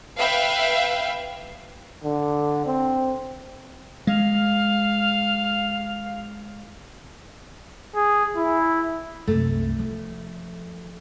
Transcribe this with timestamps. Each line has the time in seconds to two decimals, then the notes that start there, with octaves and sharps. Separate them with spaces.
0.17 B4 E5 F5 G5
2.04 D3
2.66 C4
4.07 G#3 F5
7.95 G#4
8.37 E4
9.27 C2 F#2 A3
9.79 F3